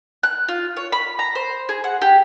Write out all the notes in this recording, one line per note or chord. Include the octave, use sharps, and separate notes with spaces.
F#6
F4
C#5
B5
A#5
C5
G#4
F#5
G4